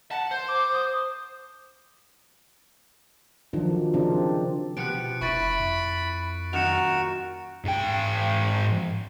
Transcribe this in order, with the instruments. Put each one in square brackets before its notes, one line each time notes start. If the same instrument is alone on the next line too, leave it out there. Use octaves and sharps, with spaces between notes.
[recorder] F#5 [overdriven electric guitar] A5
[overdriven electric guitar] C5
[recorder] D6
D#6
[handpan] D#3 F3 F#3 D4
C#3 C4 D4
[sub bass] B2 [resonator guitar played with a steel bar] F3 B3 G4 [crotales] F#6 C#7 D7
[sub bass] F1 [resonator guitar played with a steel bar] E4 [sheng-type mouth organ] B5 [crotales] C#6 A6 D7
[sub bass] F2
[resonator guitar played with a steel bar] F#2 A#2 D#3 [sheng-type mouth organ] F#4 [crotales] C#7 E7 F7
[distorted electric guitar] G#2 G5